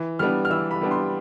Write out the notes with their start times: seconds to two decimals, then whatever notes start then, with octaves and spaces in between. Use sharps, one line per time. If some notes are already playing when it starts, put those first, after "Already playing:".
Already playing: E3
0.19 G3 B3 D4 F6
0.45 F6
0.50 E3 E6
0.71 B5
0.81 G3 B3 D4
0.91 C6